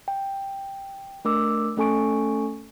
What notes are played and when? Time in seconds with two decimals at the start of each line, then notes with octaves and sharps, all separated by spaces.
0.08 G5
1.25 A3 D4 A#4 D6 E6
1.77 A3 C#4 A4 G#5 C#6 D7